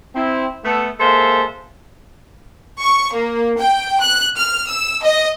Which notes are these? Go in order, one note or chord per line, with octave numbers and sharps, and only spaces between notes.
C4 E4
A3 B3 A4
G#3 A#3 A4 C5 E5 F5
C#6
A#3
G5
F#6
F6
E6
D#5